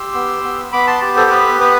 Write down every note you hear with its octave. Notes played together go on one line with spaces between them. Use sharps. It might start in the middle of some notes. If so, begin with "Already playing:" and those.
Already playing: G4 C6 E6
B3
B3
B3 B5 D6
A5 C6
G4
A4 C5
B3 B4
B3 B4